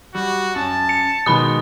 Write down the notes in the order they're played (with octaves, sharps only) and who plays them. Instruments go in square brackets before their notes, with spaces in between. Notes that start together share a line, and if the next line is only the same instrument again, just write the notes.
[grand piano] G3 [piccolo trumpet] F#4
[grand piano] F#2 [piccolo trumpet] A5
[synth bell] C#7
[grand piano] B2 D#3 G#3 [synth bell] B5 D#6